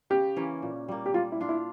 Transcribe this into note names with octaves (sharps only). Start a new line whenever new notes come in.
C#3 G4
E3 A#3 C#4
A#2
G3 A#3
G4
G3 F4
E4
D4 F4
E4